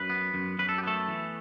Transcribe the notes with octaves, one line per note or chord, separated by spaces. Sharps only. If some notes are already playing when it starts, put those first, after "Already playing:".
Already playing: F#2 B4
B3
F#2
F#2 B4
A4
G4
A3 B3 A4
E3